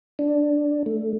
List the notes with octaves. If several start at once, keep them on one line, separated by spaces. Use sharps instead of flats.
D4
A3